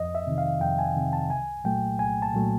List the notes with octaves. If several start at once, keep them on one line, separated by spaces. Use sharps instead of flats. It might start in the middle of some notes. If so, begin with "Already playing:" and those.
Already playing: F2 D#5
E5
C3 D#3
F5
F2 G5
G#5
C3 D#3
A5
C2 G#5
A#2 F#3 A3 G5
C2 G#5
A5
A#2 F#3 A3